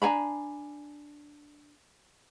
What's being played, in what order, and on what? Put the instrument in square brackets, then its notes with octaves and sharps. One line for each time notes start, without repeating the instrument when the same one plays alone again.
[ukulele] D4 G#5 A#5 B5